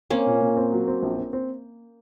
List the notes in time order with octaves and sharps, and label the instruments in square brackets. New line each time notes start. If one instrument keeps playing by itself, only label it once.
[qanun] A#3 C#4 [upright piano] C4
[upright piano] A#2
A#2
C4
F#3
C4
A#1
C4
C4